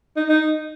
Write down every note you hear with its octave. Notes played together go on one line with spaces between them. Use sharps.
D#4
D#4